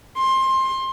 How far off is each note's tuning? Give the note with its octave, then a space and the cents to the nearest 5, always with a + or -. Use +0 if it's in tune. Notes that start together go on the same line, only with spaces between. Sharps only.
C6 +20